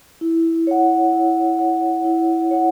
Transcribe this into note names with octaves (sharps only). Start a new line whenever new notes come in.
E4
C#5 F#5
E4
C#5 F#5
E4
C#5 F#5